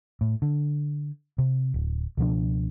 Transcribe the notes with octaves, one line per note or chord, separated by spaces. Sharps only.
A2
D3
C3
D1
C#2 B2 F3 D4